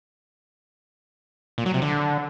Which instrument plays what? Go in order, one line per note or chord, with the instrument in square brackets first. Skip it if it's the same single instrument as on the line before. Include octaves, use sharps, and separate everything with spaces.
[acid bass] A#2
F#3
C3
D3